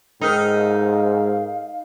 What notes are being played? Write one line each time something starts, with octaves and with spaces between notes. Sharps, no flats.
G#2 D#4 A4 A#4 G5 F6
F5